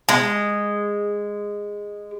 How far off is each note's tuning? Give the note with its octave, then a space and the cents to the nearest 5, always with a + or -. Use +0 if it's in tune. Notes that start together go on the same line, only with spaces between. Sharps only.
G#3 -10